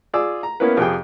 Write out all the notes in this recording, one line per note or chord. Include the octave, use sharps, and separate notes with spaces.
F4 G#4 D5 E6
A#5
A#3 B3 C#4 E4 A#4 B4
F2 C3 G4 G#4 G5